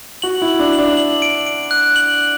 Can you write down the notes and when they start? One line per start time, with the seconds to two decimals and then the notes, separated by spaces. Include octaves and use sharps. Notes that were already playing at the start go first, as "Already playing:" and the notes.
0.22 F#4 F#7
0.42 E4
0.48 F#7
0.59 D4
0.73 F#7
0.79 D4
0.97 F#7
1.22 D7
1.47 D7
1.71 F#6
1.96 F#7
2.21 F#7